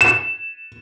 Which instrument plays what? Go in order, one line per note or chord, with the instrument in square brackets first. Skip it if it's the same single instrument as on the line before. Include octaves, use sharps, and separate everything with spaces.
[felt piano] E7